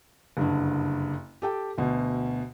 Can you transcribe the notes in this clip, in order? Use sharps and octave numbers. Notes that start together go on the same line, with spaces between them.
F#1 G2 D3
G4 A4 G5
D2 B2